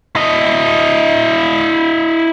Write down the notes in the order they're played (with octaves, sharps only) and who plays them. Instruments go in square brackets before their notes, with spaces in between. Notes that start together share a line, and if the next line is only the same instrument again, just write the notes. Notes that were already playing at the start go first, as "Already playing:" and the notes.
[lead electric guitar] E4 D#5